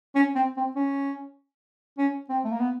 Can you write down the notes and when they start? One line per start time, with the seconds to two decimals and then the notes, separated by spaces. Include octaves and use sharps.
0.15 C#4
0.35 C4
0.57 C4
0.76 C#4
1.98 C#4
2.29 C4
2.44 A3
2.52 A#3
2.60 B3